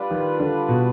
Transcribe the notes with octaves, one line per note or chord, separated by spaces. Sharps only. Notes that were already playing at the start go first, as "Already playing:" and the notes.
Already playing: G3 D4 F4 B4 D5
D#3
D3
B2